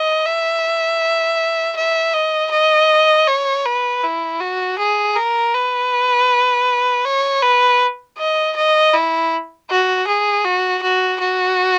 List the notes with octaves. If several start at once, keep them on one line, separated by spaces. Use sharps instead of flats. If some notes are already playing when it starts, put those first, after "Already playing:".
Already playing: D#5
E5
E5
D#5
D#5
C#5
B4
E4
F#4
G#4
A#4
B4
C#5
B4
D#5
D#5
E4
F#4
G#4
F#4
F#4
F#4